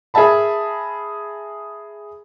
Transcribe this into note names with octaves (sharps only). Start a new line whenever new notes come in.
G#4 A#4 E5 A5 B5